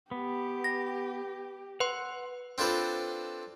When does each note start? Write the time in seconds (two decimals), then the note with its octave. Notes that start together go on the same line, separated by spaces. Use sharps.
0.11 B3 G4
0.64 A#6
1.80 B4 F#5 C6
2.58 C4 D4 F4 A4 B4 C5